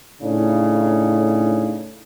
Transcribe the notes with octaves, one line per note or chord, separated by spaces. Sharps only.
A2 C#3 D4 D#4